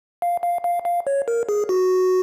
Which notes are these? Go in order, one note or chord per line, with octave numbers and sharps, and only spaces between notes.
F5
F5
F5
F5
C#5
A#4
G#4
F#4